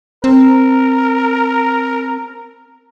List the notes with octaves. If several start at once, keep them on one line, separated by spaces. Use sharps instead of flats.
C4 A#4